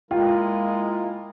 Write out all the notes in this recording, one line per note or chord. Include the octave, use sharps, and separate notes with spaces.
G#3 A#3 E4 F4 A#4 G5